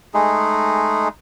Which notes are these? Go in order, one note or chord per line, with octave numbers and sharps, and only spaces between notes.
G#3 A3 D#4 G#4